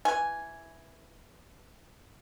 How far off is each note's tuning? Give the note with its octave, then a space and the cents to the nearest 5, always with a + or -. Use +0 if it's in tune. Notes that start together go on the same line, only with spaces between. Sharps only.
E3 +0 G#5 +0